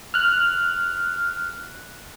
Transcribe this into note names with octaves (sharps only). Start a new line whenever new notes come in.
F6 F#6